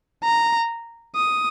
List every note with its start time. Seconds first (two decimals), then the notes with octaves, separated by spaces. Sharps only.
0.24 A#5
1.16 D#6